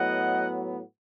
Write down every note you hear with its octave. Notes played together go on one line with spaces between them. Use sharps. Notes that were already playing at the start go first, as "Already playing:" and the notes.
Already playing: A2 F#3 B3 D#5 F#5